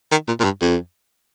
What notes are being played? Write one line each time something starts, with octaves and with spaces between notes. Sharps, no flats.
D#3
A#2
A#2
G2
F2